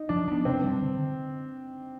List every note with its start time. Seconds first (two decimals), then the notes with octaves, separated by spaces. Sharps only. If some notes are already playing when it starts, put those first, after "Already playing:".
Already playing: D#4
0.09 F3 D4
0.28 B3 D4
0.45 C3 C4
0.64 G3 D4
0.82 D3